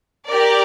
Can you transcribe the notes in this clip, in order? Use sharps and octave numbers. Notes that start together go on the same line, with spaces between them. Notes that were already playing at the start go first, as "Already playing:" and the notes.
G4 A#4 D5